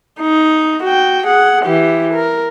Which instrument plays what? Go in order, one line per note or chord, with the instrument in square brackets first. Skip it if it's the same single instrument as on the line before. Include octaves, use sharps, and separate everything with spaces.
[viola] D#4
F#4 G5
G#4 F#5
E3 G4
A#4